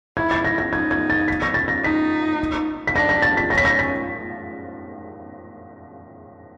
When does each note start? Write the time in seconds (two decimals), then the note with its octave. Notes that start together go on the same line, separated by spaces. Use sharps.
0.17 E4 G#6
0.31 A6
0.44 A#6
0.58 A#6
0.72 D#4 G#6
0.91 G#6
1.10 A6
1.28 B6
1.42 A#6
1.54 A6
1.68 A#6
1.84 D#4 B6
2.87 B6
2.95 D4 A#6
3.09 A#6
3.22 A6
3.37 B6
3.50 C#4 A#6
3.58 B6
3.65 A#6
3.79 B6